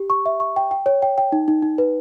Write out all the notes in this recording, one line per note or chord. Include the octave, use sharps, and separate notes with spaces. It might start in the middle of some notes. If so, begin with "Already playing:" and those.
Already playing: G4
C#6
E5
C#6
G5
G5
C#5
G5
G5
D#4
D#4
D#4
B4